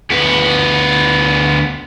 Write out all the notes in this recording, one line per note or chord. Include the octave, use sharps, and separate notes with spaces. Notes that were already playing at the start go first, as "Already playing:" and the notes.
D2 B3